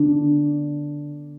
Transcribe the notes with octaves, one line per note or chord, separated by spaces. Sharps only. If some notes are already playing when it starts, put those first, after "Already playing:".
Already playing: D3 B3 D4